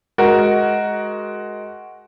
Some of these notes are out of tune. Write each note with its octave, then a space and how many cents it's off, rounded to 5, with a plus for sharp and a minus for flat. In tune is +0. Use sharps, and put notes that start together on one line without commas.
G#3 +15 F#4 +5 A#4 +10